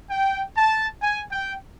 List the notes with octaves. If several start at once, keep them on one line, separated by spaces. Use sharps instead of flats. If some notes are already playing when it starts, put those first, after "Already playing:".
G5
A5
G#5
G5